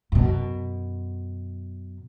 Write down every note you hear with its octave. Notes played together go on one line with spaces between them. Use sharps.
F#2 B2